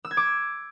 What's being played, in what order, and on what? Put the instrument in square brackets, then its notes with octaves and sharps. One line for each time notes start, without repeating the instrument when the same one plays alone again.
[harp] E6
G#6
D6